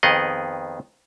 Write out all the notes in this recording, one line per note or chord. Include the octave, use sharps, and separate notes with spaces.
F2 D#3 B3 G#4 D#5